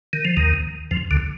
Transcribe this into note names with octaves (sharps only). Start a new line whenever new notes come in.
D#3
F3
D#2 D#3
F2 F3
D2 D3